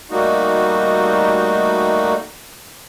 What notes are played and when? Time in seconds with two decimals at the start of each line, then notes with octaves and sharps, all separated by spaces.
0.11 G3 A3 A#3 D#4 F#4